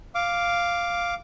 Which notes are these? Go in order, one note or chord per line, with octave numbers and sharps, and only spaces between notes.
F5 D6